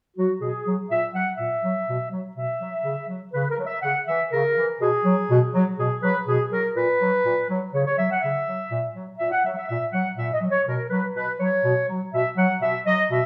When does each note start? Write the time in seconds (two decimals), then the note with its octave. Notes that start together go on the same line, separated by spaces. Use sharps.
0.15 F#3 F#4
0.41 B2 G#4
0.65 F#3
0.89 A#2 E5
1.13 F#3 F#5
1.37 A#2 E5
1.63 F#3
1.87 B2
2.11 F#3
2.35 B2 E5
2.60 F#3
2.84 C#3
3.08 F#3
3.33 C#3 B4
3.50 A#4
3.57 F#3
3.65 E5
3.82 C#3 F#5
4.06 E3 E5
4.31 C#3 A#4
4.55 E3
4.79 B2 G#4
5.04 F#3
5.29 B2
5.53 F#3
5.77 B2 G#4
6.02 F#3 B4
6.25 B2 G#4
6.50 F#3 A#4
6.74 A#2 B4
7.00 F#3
7.23 A#2
7.48 F#3
7.72 C#3 C#5
7.84 C#5
7.97 F#3 E5
8.10 F#5
8.21 C#3 E5
8.46 F#3
8.69 A#2
8.94 F#3
9.18 A#2 E5
9.31 F#5
9.43 F#3 E5
9.55 E5
9.67 A#2 E5
9.92 F#3 F#5
10.16 A#2 E5
10.32 D#5
10.41 F#3
10.49 C#5
10.66 B2 A#4
10.89 F#3 B4
11.14 B2 B4
11.39 F#3 C#5
11.63 B2
11.88 F#3
12.12 B2 E5
12.36 F#3 F#5
12.60 B2 E5
12.85 F#3 D#5
13.09 B2 E5